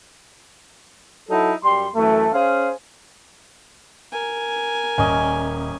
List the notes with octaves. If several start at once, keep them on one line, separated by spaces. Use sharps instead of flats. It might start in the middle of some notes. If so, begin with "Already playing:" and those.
F#3 D#4 E4 A4
F#2 G3 C6
F#2 E3 A3
C#4 G#4 C5 F5
A#4 G#5
D#1 C#4 D#5